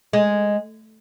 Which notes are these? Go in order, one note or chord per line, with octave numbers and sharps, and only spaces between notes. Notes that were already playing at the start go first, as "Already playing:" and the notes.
G#3